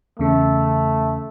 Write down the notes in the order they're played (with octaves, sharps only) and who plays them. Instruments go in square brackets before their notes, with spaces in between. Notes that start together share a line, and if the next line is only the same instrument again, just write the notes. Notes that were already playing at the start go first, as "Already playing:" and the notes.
[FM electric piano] E2 C#3 [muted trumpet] A3